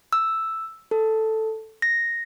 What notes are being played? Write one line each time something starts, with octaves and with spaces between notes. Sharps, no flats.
E6
A4
A#6